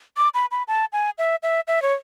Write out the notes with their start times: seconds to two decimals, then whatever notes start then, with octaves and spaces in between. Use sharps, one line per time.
0.17 D6
0.34 B5
0.51 B5
0.68 A5
0.93 G#5
1.18 E5
1.43 E5
1.68 E5
1.82 C#5